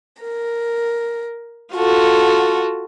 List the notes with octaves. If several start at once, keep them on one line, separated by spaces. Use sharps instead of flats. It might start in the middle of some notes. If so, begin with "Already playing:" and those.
A#4
F4 F#4 A4